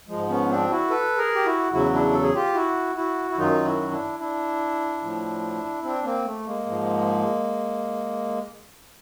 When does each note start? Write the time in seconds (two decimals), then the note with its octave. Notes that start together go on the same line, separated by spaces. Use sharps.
0.08 G#2 F3 G#3
0.29 B3 C#4
0.49 C4 D4
0.70 E4 F#4
0.90 A4 B4
1.18 G#4 A#4
1.35 G4
1.45 E4 F#4
1.72 E2 C#3 F#3 E4 F#4
1.93 D4 E4
2.12 A4
2.23 G#4
2.35 F4 G4
2.55 E4 F#4
2.95 E4 F#4
3.31 E4
3.37 F#2 D#3 F#3 D#4 F4
3.65 E4 F#4
3.92 D4 E4
4.19 D4 E4
5.02 A2 F3
5.83 C4 D4
6.04 A#3 C4
6.25 A3
6.45 G#3 A#3
6.66 G#2 F3